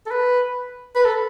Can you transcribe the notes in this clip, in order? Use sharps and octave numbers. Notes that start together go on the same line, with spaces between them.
A4
B4
B4
A4